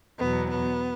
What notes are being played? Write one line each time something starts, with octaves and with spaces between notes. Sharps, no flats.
E2 B2 F#3 B3
B3